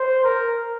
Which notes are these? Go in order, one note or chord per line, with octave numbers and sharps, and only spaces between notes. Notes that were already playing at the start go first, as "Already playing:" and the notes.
Already playing: C5
A#4